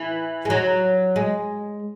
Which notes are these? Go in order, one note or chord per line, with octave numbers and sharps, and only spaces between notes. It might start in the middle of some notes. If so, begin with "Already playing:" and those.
Already playing: E3
G#3
F#3
G#3